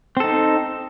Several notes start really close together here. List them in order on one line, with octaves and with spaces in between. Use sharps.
C4 A4 D#4